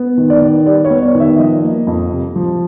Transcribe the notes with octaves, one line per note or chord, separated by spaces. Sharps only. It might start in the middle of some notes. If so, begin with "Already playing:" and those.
Already playing: B3
D#3
D5
D#3
G3 D5
C#5
B3
D5
D#3
E5
F3 D#5
A#3
F2
C3
F3